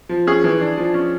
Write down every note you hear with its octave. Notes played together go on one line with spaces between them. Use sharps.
F3
C#4 G#4
E3
D4
F3
C#4